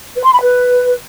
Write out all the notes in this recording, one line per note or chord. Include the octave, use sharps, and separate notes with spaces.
B4
C6
B5
B4